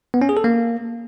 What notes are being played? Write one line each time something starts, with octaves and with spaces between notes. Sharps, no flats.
B3
C#4
G#4
A4
A#3